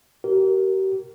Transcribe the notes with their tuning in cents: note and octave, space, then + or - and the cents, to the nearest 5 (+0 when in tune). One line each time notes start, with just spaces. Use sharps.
G4 -40 A#4 +0